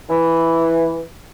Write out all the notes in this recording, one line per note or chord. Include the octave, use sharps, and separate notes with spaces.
E3